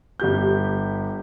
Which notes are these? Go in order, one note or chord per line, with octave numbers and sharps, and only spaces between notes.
G1 G4 G6